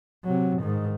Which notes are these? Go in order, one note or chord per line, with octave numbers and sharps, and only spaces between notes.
C3 F#3
G#2 D#3